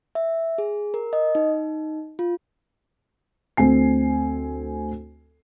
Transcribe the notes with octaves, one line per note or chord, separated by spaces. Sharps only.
E5
G#4
A#4
D#5
D#4
F4
D2 C4 G#5 C7